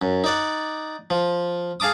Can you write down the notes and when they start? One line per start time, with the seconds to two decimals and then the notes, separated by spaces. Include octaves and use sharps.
0.02 F#2
0.24 D#4 D5 F#5
1.10 F3
1.80 G#4 F5 A5 D6 D#6